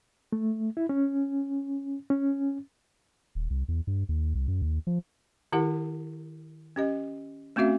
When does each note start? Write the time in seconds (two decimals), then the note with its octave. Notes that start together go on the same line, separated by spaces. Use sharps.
0.32 A3
0.77 E4
0.89 C#4
2.10 C#4
3.35 D#1
3.50 C2
3.68 E2
3.87 G2
4.09 D#2
4.35 C2
4.48 F#2
4.62 D#2
4.87 F3
5.52 D#3 E4 G4 A#4 F#5
6.76 C#4 G4 D#5
7.56 A3 C4 C#4 F#4 E5 F5